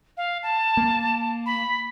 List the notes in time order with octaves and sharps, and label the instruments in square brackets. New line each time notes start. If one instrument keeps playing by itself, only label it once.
[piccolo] F5
A5
[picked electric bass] A#3
[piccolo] B5